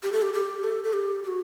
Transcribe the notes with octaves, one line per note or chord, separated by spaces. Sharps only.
G4
A4
G4
G4
A4
A4
G4
G4
F#4